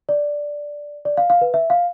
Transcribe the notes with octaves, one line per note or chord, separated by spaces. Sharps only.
D5
D5
F5
F5
B4
E5
F5